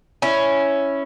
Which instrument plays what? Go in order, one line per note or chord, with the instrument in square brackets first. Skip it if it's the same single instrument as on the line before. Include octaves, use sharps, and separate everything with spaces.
[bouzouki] C#4 E4